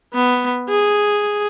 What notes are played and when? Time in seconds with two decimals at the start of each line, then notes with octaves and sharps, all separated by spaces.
0.14 B3
0.69 G#4